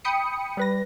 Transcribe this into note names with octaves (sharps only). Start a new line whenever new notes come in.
G5 B5 D#6 C#7
G3 B4 A#6